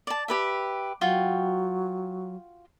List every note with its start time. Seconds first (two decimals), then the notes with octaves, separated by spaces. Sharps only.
0.07 D5 A5
0.28 G4 B4 E5
1.01 F#3 F4 F#4 G5